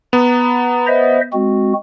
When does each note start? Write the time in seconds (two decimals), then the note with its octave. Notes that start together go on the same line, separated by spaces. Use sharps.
0.13 B3 A#5
0.87 C5 D#5 E5
1.33 G#3 C4 F#4